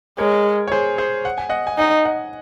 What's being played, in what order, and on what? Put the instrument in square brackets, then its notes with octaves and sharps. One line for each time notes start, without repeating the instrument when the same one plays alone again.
[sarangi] G#3 [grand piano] A#4 C#5
[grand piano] C#5
G#4 C5
G#4 C5
F#5
G#5
D#5 F#5
G#5
[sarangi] D#4 [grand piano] D#5 F#5
[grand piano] D#5 F#5